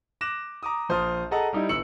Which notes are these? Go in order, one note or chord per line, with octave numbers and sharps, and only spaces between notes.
D6 F#6 A#6 E7
A#5 D6 D#6
A#1 C5 A5 D#6 F6
G#4 A4 D#5 F#5 A5 A#5
G3 D#4 E4
G1 E6 C#7 F#7